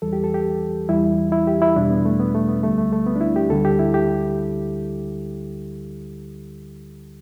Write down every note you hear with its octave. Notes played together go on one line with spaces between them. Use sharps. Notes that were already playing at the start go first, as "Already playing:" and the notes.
E2 E3 G3 A4
G4
A4
G4
E2 E3 G3 E4
E4
G4
E4
E2 B2 G3 D4
B3
A3
B3
A3
B3
D2 D3 G3 A3
A3
A3
B3
D4
E4
G4
D2 D3 G3 A4
G4
E4
G4